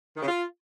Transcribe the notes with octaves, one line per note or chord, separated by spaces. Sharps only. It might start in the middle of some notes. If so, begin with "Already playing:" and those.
D#3
C#3
F4